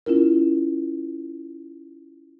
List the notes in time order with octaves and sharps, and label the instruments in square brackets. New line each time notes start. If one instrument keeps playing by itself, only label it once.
[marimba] C#4 E4 F4 A#4